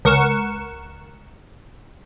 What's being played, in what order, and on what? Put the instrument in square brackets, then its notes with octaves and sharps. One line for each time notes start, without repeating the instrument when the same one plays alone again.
[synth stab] C#2 A#4 F#5 C#6 E7